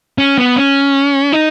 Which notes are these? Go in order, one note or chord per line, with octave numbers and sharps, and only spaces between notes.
C#4
B3
C#4
D#4